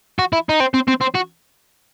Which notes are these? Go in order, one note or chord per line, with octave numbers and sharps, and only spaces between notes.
F#4
E4
D#4
C4
C4
C4
C4
F#4